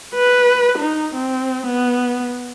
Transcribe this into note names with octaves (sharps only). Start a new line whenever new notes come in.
B4
D#4
C4
B3